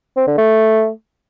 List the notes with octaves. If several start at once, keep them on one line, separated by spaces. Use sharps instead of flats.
C4
D3
A3